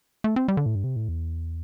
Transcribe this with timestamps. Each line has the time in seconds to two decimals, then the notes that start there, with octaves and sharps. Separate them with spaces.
0.24 A3
0.36 C4
0.48 G3
0.57 D3
0.66 A2
0.75 G2
0.84 C3
0.96 A2
1.09 E2